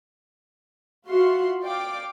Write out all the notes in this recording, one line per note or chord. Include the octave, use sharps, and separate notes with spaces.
F4 F#4 E5 F#5 C6
D5 F5 G5 D6